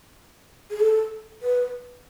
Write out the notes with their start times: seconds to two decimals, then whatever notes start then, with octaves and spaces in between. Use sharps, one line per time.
0.70 G#4
0.80 A4
1.42 B4